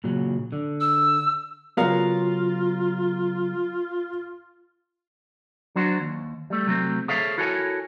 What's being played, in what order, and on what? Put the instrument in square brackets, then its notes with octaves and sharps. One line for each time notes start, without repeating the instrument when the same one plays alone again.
[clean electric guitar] A#2 C#3 F#3
D3
[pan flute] E6
[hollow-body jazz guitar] C#3 F#3 B3 [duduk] F4 [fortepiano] A#4 F5
[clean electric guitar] F#3 D4 F#4 C5
D#2
G3 A3
C3 F#3 A3 C4
G#4 A4 C5 C#5 E5 F5
E4 F#4 A4 A#4 C#5 G#5